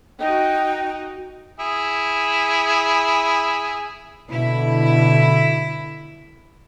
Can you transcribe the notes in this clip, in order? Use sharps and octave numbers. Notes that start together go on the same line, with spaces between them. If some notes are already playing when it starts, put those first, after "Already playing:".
D#4 F#4 D#5 G5
E4 G#4
B2 D3 E4